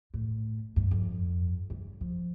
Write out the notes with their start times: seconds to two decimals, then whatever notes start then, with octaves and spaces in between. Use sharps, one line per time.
0.14 A2
0.76 G2
0.91 F2
1.70 G2
2.01 F3